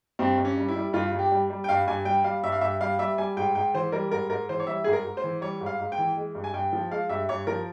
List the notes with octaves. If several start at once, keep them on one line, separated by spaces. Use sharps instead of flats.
G2 C4
G2
C#4
G3
E4
G3
G2 F4
G2
G4
G3
G3
G5
G2 F5
G2 G#5
G3 G5
G3 F5
G2 E5
F5
G2 E5
G3 F5
G3 E5
G3 G#5
G#2 G5
G#2 G5
E3 C5
G3 A#4
G#2 A#4
G#2 A#4
E3 C5
C#5
G3 E5
G#2 G#4
A#4
G#2
C5
E3
G3 C#5
G#2
F5
G#2
G5
E3
G#3
G2
G#5
G2 G5
F3
G#3 F5
G2 E5
G2 C#5
F3 A#4